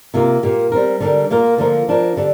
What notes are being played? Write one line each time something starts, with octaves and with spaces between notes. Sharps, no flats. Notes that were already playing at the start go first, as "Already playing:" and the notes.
C3 A#3 F4 A#4
A#2 A#3 G4
G3 C4 A#4
D3 G3 D4 G4 A#4
A#2 A#3 F4 A#4
D3 F3 A#3 F4 A#4
F3 D4 A#4
D3 G3 D4